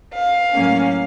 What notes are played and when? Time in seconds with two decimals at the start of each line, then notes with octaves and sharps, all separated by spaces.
0.14 F5
0.53 A2 F#3 A#3 C#4